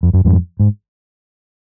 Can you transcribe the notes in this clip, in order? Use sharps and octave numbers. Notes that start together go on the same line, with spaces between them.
F2
F#2
F2 G#2
G#2